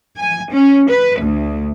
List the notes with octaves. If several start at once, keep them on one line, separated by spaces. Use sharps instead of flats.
G#5
C#4
B4
D2